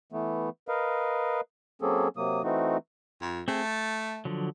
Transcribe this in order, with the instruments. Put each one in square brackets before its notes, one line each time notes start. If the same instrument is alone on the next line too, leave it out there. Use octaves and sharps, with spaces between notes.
[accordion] E3 A3 B3
A#4 B4 D#5 F5
F#3 A#3 C4 C#4 G#4 A4
C3 F#3 A#3 D#6
E3 A3 C4 D#4 F#4
[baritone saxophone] F2
[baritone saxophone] A3 [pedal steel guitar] C4 G#4
[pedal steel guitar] A5
D3 F3 F#3